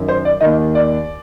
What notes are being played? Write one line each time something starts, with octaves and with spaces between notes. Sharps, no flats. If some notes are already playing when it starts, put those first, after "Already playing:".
Already playing: F#2 D#3
C5
D5
D#2 D#3 D#5
D5